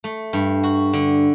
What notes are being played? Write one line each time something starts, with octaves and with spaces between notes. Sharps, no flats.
A3
G2
F#4
D3